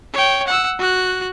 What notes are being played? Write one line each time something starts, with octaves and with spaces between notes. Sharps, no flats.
C#5 G5
F#5 E6
F#4 F#6